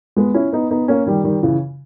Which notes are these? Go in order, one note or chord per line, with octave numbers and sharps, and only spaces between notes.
G#3 B3
C#4 E4
B3 D#4
B3 D#4
A#3 C#4
D#3 G3
D#3 G3
C#3 E3